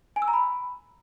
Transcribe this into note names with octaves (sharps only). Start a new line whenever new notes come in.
G#5
E6
A#5
B5